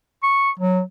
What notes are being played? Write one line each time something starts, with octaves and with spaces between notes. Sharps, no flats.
C#6
F#3